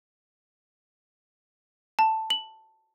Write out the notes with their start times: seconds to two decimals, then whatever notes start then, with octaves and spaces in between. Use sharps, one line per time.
1.99 A5
2.30 F#7